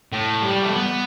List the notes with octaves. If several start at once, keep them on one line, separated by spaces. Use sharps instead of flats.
A2
G3
A3
B3